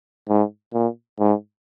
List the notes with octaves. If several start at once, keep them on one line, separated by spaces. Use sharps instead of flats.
G#2
A#2
G#2